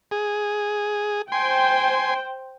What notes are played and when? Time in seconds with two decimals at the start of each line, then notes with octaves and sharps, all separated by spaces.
0.11 G#4
1.32 C5 G5 G#5 C6